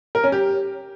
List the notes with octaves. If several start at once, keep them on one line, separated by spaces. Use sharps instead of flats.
A#4
C#4
G4